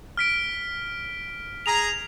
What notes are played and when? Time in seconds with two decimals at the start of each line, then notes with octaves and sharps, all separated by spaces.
0.17 F6 B6 D7
1.66 G#4 A#5 F7